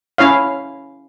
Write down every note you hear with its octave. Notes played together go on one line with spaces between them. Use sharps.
C#4 E4 C#5 F5